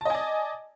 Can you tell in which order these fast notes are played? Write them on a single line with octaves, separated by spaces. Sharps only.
A5 D#5 G#5 D5